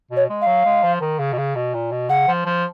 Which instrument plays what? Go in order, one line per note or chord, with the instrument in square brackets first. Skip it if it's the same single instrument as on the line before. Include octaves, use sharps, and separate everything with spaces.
[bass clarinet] B2
[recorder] C#5
[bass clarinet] G#3
[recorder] F5
[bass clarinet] F#3
G#3
F3
D#3
C#3
B2
C#3
B2
A#2
B2
[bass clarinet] C#3 [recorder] F#5
[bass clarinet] F3
F3